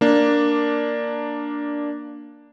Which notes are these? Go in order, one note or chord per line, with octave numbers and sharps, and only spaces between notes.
A#3 D4